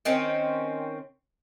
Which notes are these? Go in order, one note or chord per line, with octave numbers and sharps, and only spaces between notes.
D#3 C4 C#4